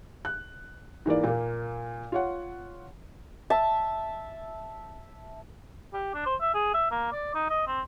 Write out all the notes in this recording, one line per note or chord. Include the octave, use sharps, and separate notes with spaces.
F#6
G#2 E3 A#3 D5
A#2 A#3
F4 C#5 F#5
E5 A5
G4
D4
C5
E5
G#4
E5
A#3
D5
D#4
D#5
C4